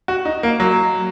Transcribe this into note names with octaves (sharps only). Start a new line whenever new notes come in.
F#4
D#4
A#3
F#3